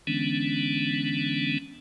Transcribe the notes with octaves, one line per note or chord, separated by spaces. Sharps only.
D3 E3 G#3 B3 C#4 D4